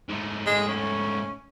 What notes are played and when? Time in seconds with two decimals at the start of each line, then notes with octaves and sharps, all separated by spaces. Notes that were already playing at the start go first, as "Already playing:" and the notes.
0.09 G#2 A3
0.46 G#3
0.68 C#4